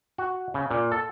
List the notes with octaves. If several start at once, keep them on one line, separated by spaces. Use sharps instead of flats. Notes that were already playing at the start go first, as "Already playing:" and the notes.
F#4
C#3
A#2
A4